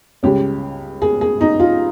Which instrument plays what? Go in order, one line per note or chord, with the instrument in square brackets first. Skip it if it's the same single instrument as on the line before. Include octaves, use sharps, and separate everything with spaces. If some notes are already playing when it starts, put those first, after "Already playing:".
[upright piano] C#2 C#3 G3 C#4 G4
G#4
G#4
D#4
F4